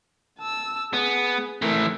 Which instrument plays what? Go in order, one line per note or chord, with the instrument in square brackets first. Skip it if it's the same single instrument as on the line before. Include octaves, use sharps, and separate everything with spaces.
[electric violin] A5 E6
[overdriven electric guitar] B3 [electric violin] G#4
[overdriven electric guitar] E3 A3 [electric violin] C4 A#4